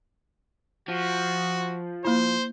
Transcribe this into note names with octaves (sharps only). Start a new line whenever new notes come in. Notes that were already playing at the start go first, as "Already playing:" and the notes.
F3 F#4
A#3 E4 C5